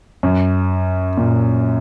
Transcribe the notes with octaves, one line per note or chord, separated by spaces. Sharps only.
F#2
A#2